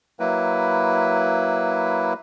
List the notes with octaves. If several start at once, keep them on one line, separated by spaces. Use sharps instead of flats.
F#3 A#3 E4 B4